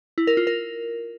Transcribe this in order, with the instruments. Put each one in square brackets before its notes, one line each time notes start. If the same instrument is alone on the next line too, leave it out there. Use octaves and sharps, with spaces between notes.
[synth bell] E4
A#4
F4
A#4